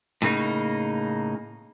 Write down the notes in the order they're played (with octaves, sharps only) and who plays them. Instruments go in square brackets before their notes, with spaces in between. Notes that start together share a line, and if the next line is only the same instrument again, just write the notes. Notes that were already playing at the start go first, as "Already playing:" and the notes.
[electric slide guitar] A2 C#3 A#3 D#4